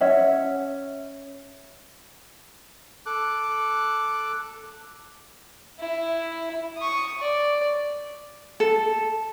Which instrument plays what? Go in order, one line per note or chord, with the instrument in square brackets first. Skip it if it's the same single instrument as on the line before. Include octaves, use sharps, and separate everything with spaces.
[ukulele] C#4 C#5 E5 F#5
[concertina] A4 D6 F#6
[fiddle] E4
C#6 D#6
D5
[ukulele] A4